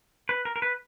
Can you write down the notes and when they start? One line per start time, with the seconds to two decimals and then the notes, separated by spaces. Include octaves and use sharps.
0.29 B4
0.45 A#4
0.56 A#4
0.62 B4